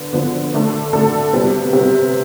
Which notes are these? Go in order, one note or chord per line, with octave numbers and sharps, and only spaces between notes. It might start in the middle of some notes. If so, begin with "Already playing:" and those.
Already playing: D3 B3
D3 F3 B3
D3 A3 D4 A4
D3 A3 D4 A4
C3 G3 B3
C3 G3 B3